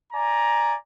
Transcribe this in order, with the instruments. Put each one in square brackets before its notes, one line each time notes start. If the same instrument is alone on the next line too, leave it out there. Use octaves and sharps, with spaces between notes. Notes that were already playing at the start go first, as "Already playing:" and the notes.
[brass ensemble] D5 G#5 A#5